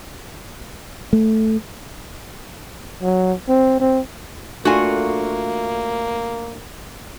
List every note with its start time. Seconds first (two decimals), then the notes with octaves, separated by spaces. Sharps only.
1.13 A3
3.02 F#3
3.48 C4
3.80 C4
4.65 A3 A#3 D4 F4 F#4 G#5